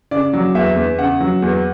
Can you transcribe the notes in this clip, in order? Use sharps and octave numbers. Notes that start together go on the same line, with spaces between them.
C#3 D5
F#3
E2 E5
E2
C#3 F#5
F#3
E2